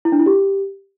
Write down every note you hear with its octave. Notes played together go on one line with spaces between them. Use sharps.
E4
D4
E4
G4